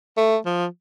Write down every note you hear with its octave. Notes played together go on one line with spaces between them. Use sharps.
A3
F3